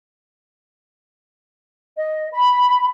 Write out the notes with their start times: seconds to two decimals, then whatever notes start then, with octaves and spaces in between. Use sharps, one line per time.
1.97 D#5
2.32 B5